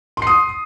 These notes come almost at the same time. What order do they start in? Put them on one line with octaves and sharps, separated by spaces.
C6 C7 D#6